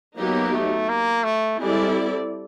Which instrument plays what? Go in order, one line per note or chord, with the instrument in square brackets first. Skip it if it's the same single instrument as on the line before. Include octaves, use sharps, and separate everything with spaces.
[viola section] F#3 B3 D#4 G4 [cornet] A#3
[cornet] A3
A#3
A3
[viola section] G3 C4 E4 A4 D5 [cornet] G#3